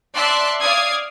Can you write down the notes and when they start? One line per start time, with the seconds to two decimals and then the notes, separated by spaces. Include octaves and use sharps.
0.15 D5 E5 A5 C6 F#6
0.61 D5 F5 D#6 G#6 C7